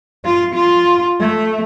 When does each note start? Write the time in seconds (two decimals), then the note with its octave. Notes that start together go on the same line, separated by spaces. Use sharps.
0.25 F4
0.55 F4
1.20 A3